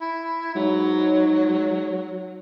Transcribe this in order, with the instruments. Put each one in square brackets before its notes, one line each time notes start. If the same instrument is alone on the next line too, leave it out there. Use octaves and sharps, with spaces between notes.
[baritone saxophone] E4
[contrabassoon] G#2 [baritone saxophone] F#3